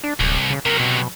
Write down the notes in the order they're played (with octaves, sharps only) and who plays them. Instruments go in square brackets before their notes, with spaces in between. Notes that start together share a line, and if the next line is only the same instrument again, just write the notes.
[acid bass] D4
[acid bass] D1 [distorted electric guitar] C2
[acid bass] C#3
[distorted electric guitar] C3 F#3 [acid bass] A#4
[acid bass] B2